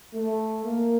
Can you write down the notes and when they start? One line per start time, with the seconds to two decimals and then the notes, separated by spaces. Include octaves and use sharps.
0.15 A3
0.65 A#3